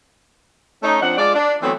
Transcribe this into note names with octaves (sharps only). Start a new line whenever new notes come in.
A3 C#4 D#4
F3 C4 D4 F#5
G#3 F4 D5
D4
E3 F#3 A3 B3 C4